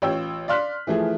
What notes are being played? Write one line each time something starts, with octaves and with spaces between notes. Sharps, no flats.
A1 F4 C#5 G5 E6
D5 F5 C6 F6 F#6 B6
E3 F3 A3 G#4